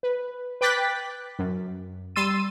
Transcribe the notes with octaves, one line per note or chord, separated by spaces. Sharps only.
B4
B4 G5 D6 F#6 A6 B6
F#2
G3 C6 E6 A6 D#7